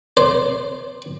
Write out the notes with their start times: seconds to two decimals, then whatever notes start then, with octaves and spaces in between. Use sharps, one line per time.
0.17 C5